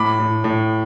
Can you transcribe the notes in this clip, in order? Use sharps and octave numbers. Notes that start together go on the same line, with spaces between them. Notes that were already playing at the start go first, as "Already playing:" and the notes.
Already playing: A2 B5 D6
A2
A2